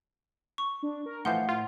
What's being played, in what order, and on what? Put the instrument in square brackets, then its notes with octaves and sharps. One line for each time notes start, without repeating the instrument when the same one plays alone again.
[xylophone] C#6
[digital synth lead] D4
A#4
[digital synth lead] A2 [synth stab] E3 F3 G6 [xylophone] F5 F#5
[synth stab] F4